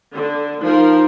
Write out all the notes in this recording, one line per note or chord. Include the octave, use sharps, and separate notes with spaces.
D3
F3 D#4 A#4